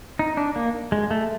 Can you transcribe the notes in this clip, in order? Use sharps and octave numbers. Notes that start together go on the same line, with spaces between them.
D#4
D4
A#3
G#3
A3